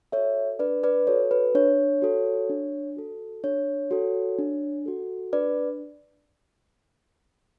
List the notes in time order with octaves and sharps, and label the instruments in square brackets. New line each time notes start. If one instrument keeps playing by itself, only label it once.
[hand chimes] F#4 A4 C#5 E5
D4 B4 D5
B4 D5
F#4 A4 C#5
B4
D4 C#5
F#4 A4
D4
F#4 A4
D4 C#5
F#4 A4
D4
F#4 A4
D4 B4 D5